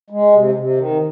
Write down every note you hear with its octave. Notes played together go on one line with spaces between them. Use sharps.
G#3
C3
C3
D#3